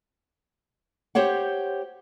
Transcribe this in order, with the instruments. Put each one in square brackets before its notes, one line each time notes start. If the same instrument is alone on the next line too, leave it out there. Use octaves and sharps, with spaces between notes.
[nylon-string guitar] G4 C5 C#5 F#5